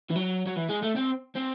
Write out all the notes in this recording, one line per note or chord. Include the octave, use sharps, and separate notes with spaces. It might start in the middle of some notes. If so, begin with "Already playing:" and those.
E3
F#3
F#3
E3
G#3
A3
C4
C4